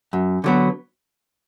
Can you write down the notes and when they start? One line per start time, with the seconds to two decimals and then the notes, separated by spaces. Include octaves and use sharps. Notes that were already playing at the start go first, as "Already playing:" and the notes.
0.13 F#2
0.44 D3 F#3 B3